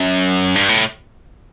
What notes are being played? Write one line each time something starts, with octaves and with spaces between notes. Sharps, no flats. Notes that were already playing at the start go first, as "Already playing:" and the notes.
Already playing: F#2
G2
A2